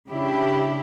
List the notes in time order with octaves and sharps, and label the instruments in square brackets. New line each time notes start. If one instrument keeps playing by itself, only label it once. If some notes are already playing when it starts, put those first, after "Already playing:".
[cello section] C#3 D4 E4 G4